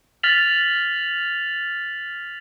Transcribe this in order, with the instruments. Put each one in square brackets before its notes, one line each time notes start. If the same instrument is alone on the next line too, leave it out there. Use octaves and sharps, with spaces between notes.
[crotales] F6 A6 B6 F7 F#7